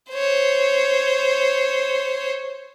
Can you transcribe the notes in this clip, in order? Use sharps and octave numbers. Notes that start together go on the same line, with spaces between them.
C5 C#5